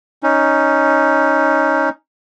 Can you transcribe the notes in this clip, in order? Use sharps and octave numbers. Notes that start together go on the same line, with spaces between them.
C#4 D#4